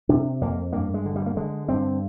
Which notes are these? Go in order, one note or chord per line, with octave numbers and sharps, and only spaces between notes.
C3 D4
F2 A#3
G2 A#3
G#3
D3
G3
A#3
D3 G#3
G2 C4